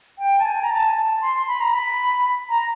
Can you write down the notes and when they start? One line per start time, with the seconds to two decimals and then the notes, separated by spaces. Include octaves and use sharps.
0.19 G5
0.39 A5
0.45 G#5
0.63 A#5
0.70 A5
0.88 G#5
0.95 A5
1.21 C6
1.47 B5
1.60 A#5
1.74 B5
2.49 A#5